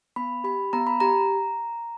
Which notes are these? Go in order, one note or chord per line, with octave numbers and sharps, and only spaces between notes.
B3 B5
G4 B5
B3 A#5
B5
G4 A#5